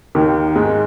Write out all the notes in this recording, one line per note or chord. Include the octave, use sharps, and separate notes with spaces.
D#2 D#3
G#2 G#3